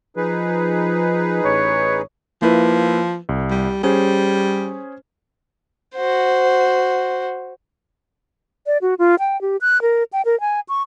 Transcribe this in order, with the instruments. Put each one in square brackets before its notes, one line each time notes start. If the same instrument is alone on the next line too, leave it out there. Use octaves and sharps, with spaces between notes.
[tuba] F3 [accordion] D#4 G#4 B4
[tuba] A1 [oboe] C#5
[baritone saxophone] F3 [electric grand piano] A#3 E4 B4
[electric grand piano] C2
[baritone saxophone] G3
[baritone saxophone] G3 [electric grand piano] C#4 G#4 C5
[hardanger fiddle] F#4 C5
[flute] D5
F#4
F4
G5
G4
F#6
A#4
G5
A#4
G#5
C#6